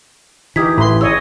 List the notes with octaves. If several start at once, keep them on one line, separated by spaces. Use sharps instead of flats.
E3 D#4 G4 D#6 G#6 B6
A1 E4 B4 A#5 C6
G#4 C#5 D#5 E6